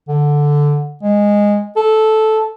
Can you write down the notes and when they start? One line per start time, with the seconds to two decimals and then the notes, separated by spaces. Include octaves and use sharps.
0.08 D3
1.02 G#3
1.76 A4